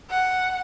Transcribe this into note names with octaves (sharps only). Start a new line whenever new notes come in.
F#5